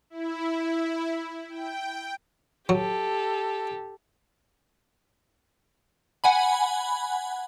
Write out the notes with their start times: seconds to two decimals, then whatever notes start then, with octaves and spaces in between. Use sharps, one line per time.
0.10 E4
1.49 G5
2.69 F#3 G4 A4
6.24 F#5 G#5 B5